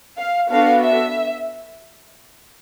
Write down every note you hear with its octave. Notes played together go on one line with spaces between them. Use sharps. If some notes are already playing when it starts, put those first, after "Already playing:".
F5
B3 D4 F#4 A4 F5
E5